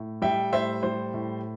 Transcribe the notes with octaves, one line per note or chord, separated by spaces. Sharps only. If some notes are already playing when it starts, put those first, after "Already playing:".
Already playing: A2
G3 E5 G5
A2 C5 E5
G3 C5
A2